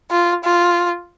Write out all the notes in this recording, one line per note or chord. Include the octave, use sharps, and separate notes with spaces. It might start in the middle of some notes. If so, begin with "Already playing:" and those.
F4
F4